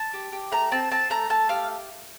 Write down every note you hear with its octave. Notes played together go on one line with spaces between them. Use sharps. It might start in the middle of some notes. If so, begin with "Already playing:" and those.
Already playing: A5
G4
G4
A3 A#5
C4 A5
C4 A5
A3 A#5
A3 A5
G4 F5